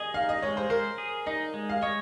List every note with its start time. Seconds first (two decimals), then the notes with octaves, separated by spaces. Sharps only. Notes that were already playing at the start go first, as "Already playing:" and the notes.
Already playing: G#4 D#5
0.14 D#4 F5
0.29 D#5
0.42 G#3 C#5
0.57 C5
0.70 A#4 C5
0.98 G#4
1.26 D#4 D#5
1.54 G#3
1.69 F5
1.82 C#5 D#5